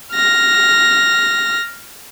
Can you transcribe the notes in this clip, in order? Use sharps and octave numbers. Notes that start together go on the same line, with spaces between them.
F6 A#6